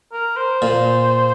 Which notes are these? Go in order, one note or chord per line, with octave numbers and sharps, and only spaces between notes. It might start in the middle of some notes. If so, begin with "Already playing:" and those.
A#4
C5
A#2